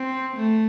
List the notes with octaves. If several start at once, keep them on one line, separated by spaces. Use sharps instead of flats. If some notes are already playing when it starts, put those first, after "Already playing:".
Already playing: C4
A3